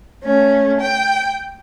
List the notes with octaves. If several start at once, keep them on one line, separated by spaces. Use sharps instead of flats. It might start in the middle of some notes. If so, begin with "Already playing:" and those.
A3 C#4
G5